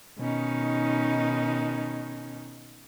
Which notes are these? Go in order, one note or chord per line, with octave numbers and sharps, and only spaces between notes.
B2 D#3 C#4 D#4